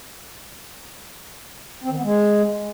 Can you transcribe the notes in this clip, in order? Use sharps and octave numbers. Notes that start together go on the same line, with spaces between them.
C4
D#3
B3
G#3